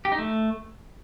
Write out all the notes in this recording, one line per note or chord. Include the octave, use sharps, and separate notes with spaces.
G4
D#4
A3